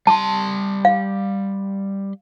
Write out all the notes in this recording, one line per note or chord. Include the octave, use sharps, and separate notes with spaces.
G3 A5 C6
F5